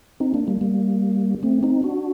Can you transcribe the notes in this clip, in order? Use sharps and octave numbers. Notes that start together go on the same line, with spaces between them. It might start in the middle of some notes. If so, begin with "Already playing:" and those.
C4 D#4
A#3 D4
G3 A#3
G3 A#3
A3 C4
C4 D#4
D4 F#4